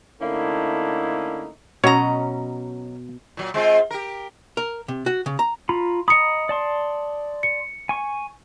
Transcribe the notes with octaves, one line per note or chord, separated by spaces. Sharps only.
D3 A3 A#3 C#4 D#4 E4
B2 F#3 C#4 C#5 D#5 A#5
A#2 F#3
G#3 C4 F4
G4 A#4
A#4
C3
F#4
C#3
A#5
F4 A#5 B5
D#5 A#5 B5 D#6 C#7
D5 A5 C6
C#7
G#5 C#6